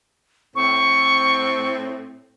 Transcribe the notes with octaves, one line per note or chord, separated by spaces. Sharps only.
A2 C4 C#6